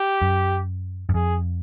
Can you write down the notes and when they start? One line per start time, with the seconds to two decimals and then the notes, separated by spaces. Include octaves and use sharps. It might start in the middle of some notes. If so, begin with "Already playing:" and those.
Already playing: G4
0.22 F#2
1.09 F#2
1.14 F2 G#4